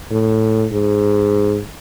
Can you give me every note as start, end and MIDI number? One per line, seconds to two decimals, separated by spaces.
0.11 0.66 45
0.72 1.60 44